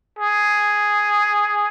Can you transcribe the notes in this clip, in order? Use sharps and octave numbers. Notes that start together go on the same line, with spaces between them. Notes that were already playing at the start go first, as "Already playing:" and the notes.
G#4